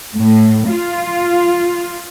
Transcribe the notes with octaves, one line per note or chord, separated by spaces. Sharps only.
A2
F4